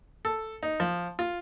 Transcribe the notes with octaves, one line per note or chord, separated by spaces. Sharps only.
A4
D#4
F3
F4